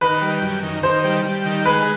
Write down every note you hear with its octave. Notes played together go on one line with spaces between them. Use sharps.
D#3 B4
G3
F#2
D#3
D#3 C5
G3
G3
D#3
G#3 B4